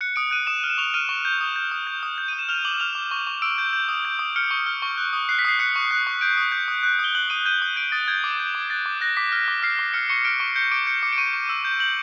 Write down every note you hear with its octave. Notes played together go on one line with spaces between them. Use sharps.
F#6 C#7
D#6 D7
F#6 D#7
D#6 E7
F6
E7
C#6 F7
F6 D#7
C#6
G6
D#6
G6
D#6
G6
D#6
G6
D#7
D#6
E7
F6 F7
D6 F#7
F6 F7
D6
C#6
C#6
E6 D7
G6
G6
D#6
G6
D#6
F6 C#7
C#6
F6
C#6
F#6
D#6
F#6 C7
B6
D#6 C7
F#6 C#7
C#6
F#6
C#6
G6 D7
D#6
G6
D#6
F#6
D#6
G7
F#6 F#7
D#6 D#7
G6 D#7
D#6
G6 D7
D#6 A6
G6 G#6
D6
G6
D6
F#6 A6
D6
F#6 A#6
D6 B6
F6
D6
F6 C7
D6
F6 C#7
C#6 C#7
F6 D7
C#6
G6 C#7
D6 D7
G6 C#7
D6 C#7
D7
C#6 D#7
C#6
E6
G6
G6 F#7